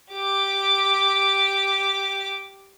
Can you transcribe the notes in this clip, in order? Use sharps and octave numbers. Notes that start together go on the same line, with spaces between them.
G4 D6